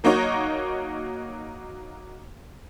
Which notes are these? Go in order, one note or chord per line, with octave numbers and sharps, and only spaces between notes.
F#3 A#3 D#4 F#4 C#5